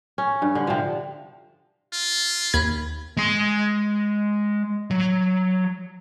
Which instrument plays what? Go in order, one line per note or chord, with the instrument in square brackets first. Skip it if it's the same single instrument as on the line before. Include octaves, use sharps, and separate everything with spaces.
[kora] C#4
G2
D3
C3 F3
[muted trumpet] F4
[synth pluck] D#2 B5 G#6
[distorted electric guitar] G#3 C6
F#3